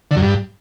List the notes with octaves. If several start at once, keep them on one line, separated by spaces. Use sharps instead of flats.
D3
F#2
G2